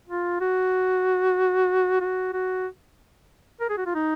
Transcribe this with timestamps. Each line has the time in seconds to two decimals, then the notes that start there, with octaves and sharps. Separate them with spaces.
0.08 F4
0.40 F#4
2.01 F#4
2.33 F#4
3.60 A#4
3.69 G#4
3.77 F#4
3.86 F4
3.95 D#4